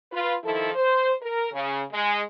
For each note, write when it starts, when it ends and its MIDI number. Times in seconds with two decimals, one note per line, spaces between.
0.12 0.35 65
0.12 0.35 71
0.44 0.71 51
0.44 0.71 53
0.44 0.71 64
0.44 0.71 69
0.74 1.12 72
1.22 1.52 70
1.53 1.82 49
1.92 2.22 56